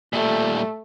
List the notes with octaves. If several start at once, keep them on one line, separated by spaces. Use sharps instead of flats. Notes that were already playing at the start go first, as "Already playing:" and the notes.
A#2 G3 A3